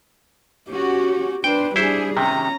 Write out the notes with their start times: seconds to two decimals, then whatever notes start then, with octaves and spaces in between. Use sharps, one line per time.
0.70 C#4 F#4 G4
1.44 D4 B4 C5 G5
1.76 G3 D4 E4 G#4 C5
2.17 C3 D#3 C#4 A#5